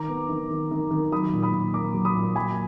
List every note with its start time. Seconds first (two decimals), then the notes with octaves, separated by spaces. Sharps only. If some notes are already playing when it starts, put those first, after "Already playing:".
Already playing: D#3 A#5 D6
0.08 B3
0.29 D#3
0.50 D#3
0.71 D#3
0.91 D#3
1.12 F#3 B5 D#6
1.33 A#2
1.42 B5 D#6
1.54 A#2
1.74 A#3 A#5 D6
1.94 F#3
2.05 B5 D#6
2.15 A#2
2.35 F#3 G#5 B5